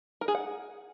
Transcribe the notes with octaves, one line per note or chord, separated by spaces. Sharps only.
A#4
G#4
F#5